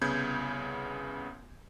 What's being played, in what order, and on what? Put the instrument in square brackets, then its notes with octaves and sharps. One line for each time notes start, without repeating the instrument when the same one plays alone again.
[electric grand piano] C2 C#3 B3 G6 G#6